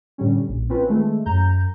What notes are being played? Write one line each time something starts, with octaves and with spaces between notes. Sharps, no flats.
A2 D3 G3 C#4
A#1
C4 C#4 F4 B4
D#3 G#3 A3
F#2 A#5 G6